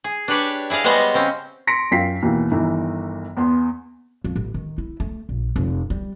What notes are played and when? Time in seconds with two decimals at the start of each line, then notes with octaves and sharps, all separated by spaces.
0.04 G#4
0.28 D4 G4 B4 C#5 D5
0.70 E4 G#4 D5 D#5 F5
0.84 G3 G#3 B3 C5 C#5 D#5
1.14 C#3 C4 C#4
1.67 C6 A#6 B6 C#7 D7
1.91 F#2 F4 G5 B6 C7
2.22 D#2 B2 E3
2.51 G1 D#3 E3
3.37 E2 B3 C6
4.24 F2
4.36 A1
4.54 D#3
4.78 E4
5.00 A3
5.29 A#1
5.56 F1
5.90 G3